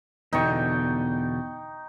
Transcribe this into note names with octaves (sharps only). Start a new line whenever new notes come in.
E2 B2 D3 D#4 G5 C#6